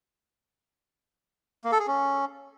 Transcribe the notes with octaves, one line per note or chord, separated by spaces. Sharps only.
A#3
A4
G#4
C#4